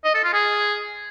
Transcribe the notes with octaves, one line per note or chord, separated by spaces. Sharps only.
D#5
A4
F4
G#4